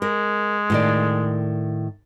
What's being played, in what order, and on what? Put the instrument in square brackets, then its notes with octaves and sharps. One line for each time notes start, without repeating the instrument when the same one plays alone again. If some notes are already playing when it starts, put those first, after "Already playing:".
[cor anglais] G#3 [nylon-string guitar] A#4
[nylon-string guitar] A2 D#3 D5